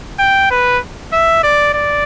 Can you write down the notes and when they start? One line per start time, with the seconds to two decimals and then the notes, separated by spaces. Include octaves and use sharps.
0.19 G5
0.51 B4
1.13 E5
1.43 D5
1.74 D5